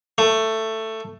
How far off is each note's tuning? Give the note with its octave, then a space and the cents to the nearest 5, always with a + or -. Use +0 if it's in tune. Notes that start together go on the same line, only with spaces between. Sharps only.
A3 +10